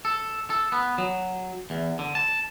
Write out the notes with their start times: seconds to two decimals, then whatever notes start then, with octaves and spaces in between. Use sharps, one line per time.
0.05 A4
0.50 A4
0.72 B3
0.98 F#3
1.70 E2
1.99 D3
2.15 A5